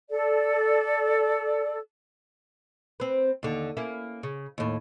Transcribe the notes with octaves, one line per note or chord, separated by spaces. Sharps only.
A4 D5
C4 B4
D#2 D3
A#3 C#4 E4
C#3
D#2 A2